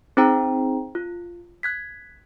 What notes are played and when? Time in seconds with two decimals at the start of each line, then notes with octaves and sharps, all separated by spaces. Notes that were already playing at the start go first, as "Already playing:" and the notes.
0.17 C4 D#4 G#4 C5 G5 A#5
0.95 F4
1.63 F#6 G#6 B6